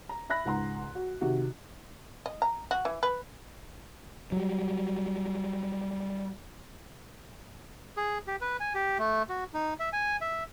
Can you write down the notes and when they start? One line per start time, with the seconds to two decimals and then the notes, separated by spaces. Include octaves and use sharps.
0.09 A#5
0.30 E5 B5 F#6 A#6
0.45 C#2 G#2 F#5 A#5 C6
0.95 F#4
1.21 C3 D#3 F#4
2.26 D#5
2.42 A#5
2.71 F#4
2.85 E3
3.03 B4
4.32 F#3 G3
7.97 G#4
8.27 G4
8.41 B4
8.60 G#5
8.75 G4
8.99 A3
9.29 F#4
9.54 D#4
9.80 E5
9.93 G#5
10.21 E5